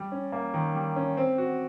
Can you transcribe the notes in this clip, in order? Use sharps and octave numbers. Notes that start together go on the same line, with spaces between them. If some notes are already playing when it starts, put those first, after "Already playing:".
Already playing: G3
C#4
A#3
D#3
G3
C#4
C4
F#4